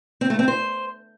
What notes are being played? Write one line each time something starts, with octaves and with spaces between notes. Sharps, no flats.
C4
A3
C4
C5